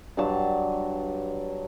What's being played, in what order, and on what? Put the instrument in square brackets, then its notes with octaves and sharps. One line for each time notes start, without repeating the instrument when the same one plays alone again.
[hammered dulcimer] G2 F#3 A5